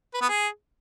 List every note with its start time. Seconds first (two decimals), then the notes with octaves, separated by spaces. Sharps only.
0.14 B4
0.21 B3
0.29 G#4